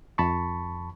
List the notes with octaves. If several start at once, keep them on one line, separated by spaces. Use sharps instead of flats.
F2 A5 B5 C#6